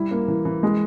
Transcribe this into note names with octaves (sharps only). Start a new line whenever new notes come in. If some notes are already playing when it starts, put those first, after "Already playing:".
Already playing: G3 E4
A#3
E3
E3
G#3